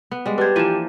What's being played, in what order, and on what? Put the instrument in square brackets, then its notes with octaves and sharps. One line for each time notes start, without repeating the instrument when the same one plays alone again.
[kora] B3
G3 G#3
[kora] D4 C5 [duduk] G4 [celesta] B4 G#6
[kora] E3 F3 A#3 [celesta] D#7 E7